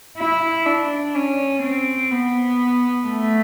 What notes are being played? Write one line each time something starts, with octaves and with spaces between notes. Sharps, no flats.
E4
D4
C#4
C4
B3
A3